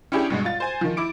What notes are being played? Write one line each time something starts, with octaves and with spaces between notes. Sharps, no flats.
C#4 D4 E4 G4 G#4 G5
G2 B2 G#3
F4 A6
C5 G#5
D#3 F3
E4 D6 D7